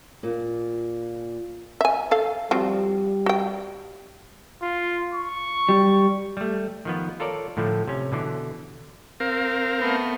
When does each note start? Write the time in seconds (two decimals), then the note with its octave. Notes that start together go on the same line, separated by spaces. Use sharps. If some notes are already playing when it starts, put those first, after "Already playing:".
0.23 A#2
1.81 E5 G#5
2.11 A4 F5
2.51 F3 G3 C4 F#4
3.26 F#4 G5
4.62 F4
5.14 C#6
5.69 G3
6.37 G3 A3
6.85 D#3 F3 B3
7.20 F4 A4 A#4 C#5 D5
7.57 A2 D3 F3 A3
7.88 C3 C#4
8.12 B2 D3 E3
9.20 C4 A#4 F5
9.79 A3 B3